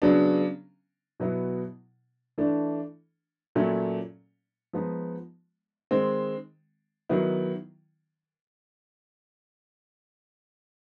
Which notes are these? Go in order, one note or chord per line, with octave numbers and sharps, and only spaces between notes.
C#3 F#3 B3 D4
B2 F#3 B3 E4
E3 A3 D4
A#2 F#3 A3 C#4
F3 G#3 B3 D#4
D#3 G#3 C4
D#3 F#3 B3 E4